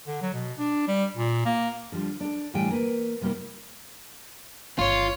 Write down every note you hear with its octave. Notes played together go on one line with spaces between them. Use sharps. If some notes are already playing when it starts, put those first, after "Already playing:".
D3
F#3
B2
D4
G3
A#2
A#3
D3 F3 G3
D4 A4
A2 D3 E3 G3 G5 G#5
A#3 B4
C3 G3 A#3 D#4 F#4
G1 D#3 F4 C#5